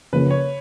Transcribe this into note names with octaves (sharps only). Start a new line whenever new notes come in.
C#3 F3 A#3 C#4 B4
C#5